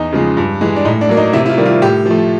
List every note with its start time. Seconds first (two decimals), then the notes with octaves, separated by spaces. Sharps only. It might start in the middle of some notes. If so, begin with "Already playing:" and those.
Already playing: E2 D#4
0.12 C#3 F3 G#3
0.37 G2
0.61 E3 G#3
0.76 D4
0.85 A2 D#4
1.01 D4
1.09 F#3 A#3
1.17 D#4
1.33 C3 E4
1.46 E4
1.49 F4
1.57 D#3 G3 A#3
1.66 F4
1.82 A2 G4
2.06 F3 A3